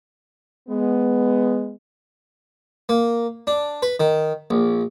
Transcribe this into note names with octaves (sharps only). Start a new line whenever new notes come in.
G#3 B3
A#3
D4
B4
D#3
A#1